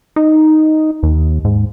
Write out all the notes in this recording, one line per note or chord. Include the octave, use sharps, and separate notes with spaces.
D#4
D#2
G#2